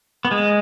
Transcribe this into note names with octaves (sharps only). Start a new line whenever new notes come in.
B3
G#3